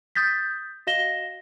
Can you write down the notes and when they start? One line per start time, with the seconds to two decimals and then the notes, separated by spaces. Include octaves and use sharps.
0.15 D#6 G6 A6 B6
0.87 F#4 D#5 F5 A#6 E7 G7